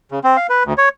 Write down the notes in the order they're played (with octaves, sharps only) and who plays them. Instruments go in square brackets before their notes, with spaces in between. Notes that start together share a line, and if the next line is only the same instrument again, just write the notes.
[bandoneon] C#3
C4
F5
B4
D2
C#5